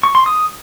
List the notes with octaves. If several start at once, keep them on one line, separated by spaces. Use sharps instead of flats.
C#6
C6
D#6